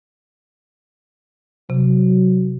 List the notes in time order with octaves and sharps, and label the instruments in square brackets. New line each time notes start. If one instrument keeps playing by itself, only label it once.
[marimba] C3 [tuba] F#3